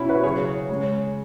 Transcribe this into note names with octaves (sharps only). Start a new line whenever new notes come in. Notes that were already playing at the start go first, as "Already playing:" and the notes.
Already playing: B2 C#4 E4
F#4 B4
C#3 F#3 G#4 C#5
C#3 G#3